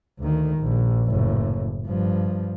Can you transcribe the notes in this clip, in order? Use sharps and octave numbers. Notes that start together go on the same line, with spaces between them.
D2 D#3
A#1
F#1 A2
G2 F3